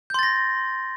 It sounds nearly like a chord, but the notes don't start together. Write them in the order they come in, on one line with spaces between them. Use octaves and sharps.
G6 C6 A6 A#6